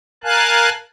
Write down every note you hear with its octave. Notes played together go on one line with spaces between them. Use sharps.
A#4 F5 G#5 A5 F#6